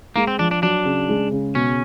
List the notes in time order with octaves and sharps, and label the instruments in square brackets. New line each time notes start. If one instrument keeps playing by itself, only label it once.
[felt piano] G#3 [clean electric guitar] A#3
[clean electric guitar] C4
[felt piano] F3 [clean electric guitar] D4
[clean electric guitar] D4
[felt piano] F#3 [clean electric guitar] D4
[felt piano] C#3
G#3
C#3
[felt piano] B2 [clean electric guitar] C#4